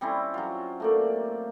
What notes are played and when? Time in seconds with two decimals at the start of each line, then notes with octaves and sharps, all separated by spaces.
0.01 G3 C4 C#4 E4
0.34 F#3 F4
0.80 A3 A#3 D5